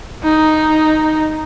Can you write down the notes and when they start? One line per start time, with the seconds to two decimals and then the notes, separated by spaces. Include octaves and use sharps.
0.24 D#4